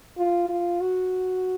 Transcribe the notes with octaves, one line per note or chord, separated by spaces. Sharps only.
F4
F4
F#4